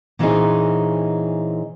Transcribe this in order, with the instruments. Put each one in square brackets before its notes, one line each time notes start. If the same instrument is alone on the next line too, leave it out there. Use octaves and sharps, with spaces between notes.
[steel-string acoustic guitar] A#2 E3 C4 C#4 D#4 G#4